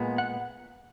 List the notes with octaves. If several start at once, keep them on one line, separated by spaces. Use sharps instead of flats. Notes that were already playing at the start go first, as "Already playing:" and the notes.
Already playing: A#2 G#3 B3
F#5